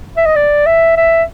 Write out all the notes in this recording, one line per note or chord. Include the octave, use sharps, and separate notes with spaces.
E5
D#5
D5
E5
E5